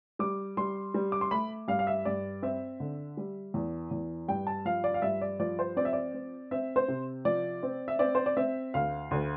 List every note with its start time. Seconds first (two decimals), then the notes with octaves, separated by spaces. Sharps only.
0.19 G3 D6
0.57 G3 C6
0.94 G3
1.12 D6
1.21 C6
1.31 A3 B5
1.68 G2 F5
1.79 F5
1.87 E5
2.05 G2 D5
2.42 C4 E5
2.80 D3
3.17 G3
3.54 E2
3.91 E2
4.28 G2 G5
4.47 A5
4.65 F3 F5
4.84 D5
4.94 F5
5.02 G2 E5
5.21 D5
5.40 F3 D5
5.59 C5
5.76 C4 D5
5.85 E5
5.93 D5
6.14 C4
6.51 C4 E5
6.76 C5
6.88 C3
7.25 F3 D5
7.63 C4
7.88 E5
7.99 C4 D5
8.15 C5
8.26 D5
8.37 C4 E5
8.74 D2 F5
9.11 D2